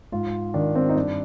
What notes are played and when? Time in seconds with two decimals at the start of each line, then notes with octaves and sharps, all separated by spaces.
0.12 G#2 F4
0.54 D#3 D4
0.75 C4
0.89 D#4
0.95 G2 D4